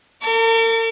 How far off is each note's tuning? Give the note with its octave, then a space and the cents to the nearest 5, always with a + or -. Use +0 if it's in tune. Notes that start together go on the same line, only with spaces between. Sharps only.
A#4 -45 D6 -40